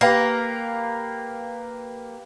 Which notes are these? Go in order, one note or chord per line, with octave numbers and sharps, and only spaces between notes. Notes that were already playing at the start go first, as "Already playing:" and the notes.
A#3 G4 B4 F5